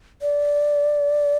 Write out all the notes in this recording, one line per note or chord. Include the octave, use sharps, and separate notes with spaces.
D5